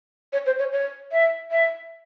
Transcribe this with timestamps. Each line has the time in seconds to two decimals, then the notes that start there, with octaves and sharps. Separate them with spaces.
0.33 C#5
0.46 C5
0.59 C#5
0.73 C#5
1.12 E5
1.51 E5